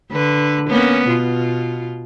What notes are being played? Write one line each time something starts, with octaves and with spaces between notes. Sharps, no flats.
D3 B4
A#3 B3 C#4
B2 F4